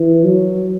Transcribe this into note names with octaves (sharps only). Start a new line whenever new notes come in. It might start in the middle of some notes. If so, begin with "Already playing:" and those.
Already playing: E3
F#3